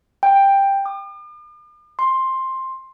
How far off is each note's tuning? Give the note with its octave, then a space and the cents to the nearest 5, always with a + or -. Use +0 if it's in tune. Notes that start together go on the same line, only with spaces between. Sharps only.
G5 +10
D6 +45
C6 +10